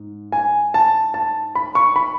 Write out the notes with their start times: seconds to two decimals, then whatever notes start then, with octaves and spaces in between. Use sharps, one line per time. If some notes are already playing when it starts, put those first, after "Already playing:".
Already playing: G#2
0.32 G#5
0.74 A5
1.14 A5
1.55 B5
1.75 C#6
1.96 B5